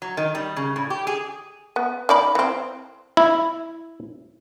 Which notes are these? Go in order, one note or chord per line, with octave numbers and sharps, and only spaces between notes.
F#3
D#3
G3
C#3
A2
G4
G#4
B3
D#3 D5 B5
E3 C4
E4